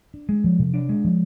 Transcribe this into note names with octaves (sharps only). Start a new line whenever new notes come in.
D4
G#3
F3
C3
D4
G#3
F3